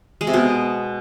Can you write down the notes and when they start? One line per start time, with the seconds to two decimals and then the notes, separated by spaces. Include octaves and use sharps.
0.21 G#3
0.27 C3
0.34 B2